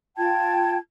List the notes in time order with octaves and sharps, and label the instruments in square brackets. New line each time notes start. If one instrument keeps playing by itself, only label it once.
[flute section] F4 G5 A5 G#6